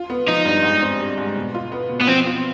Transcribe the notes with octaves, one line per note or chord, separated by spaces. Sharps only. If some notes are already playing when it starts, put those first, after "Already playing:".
Already playing: F4
B3
F3 D#4
G2
G#2
C4
G3
G#2
B2
F4
B3
B2
B3
F3 C4
F4